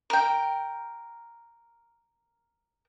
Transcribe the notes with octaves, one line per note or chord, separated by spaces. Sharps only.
A#4 G5